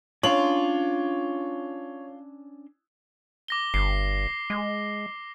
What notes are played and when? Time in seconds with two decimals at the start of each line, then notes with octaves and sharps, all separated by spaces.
0.23 C#4 D4 F4 C#5 C6 F#7
3.48 D6 A#6 G7
3.74 G1 C7
4.50 G#3